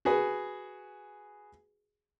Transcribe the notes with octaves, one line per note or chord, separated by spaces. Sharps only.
F#4 G#4 B4